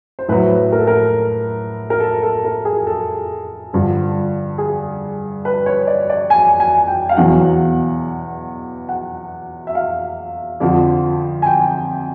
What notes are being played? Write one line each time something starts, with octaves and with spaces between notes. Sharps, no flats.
C5
A2 F#3 B4
A#4
A4
A#4
A#4
A4
A4
A#4
G#4
A4
G2 D3 F3
G#4
B4
C#5
D5
D5
G#5
G#5
G5
F5
E2 B2 F#3 F#5
F#5
E5
F5
F2 D3 F3
G#5
G5